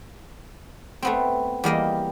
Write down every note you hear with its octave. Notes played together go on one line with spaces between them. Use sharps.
A3 B3 C4
E2 G3 A#3 D#5